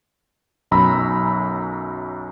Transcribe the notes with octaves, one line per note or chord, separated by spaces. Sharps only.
B1 F#2 A#5 B5 E6